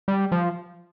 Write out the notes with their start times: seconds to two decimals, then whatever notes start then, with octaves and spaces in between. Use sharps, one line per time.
0.08 G3
0.32 F3